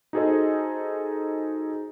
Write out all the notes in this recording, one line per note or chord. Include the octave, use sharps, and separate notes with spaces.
D#4 F#4 G#4 A4 C5 D#5